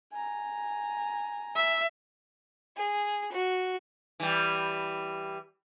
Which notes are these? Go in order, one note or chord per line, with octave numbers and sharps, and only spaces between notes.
G#5 A#5
E5
G#4
F#4
E3 G3